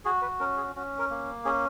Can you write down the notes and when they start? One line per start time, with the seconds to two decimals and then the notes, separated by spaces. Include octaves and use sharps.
0.05 F#4 G#4
0.22 B4
0.40 C#4 A#4
0.57 G#4
0.75 C#4 F#4
0.99 A#4
1.10 A#3
1.45 C#4 G#4